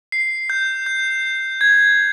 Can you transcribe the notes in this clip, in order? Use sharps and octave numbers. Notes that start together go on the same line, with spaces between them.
C7
G6
G6
G#6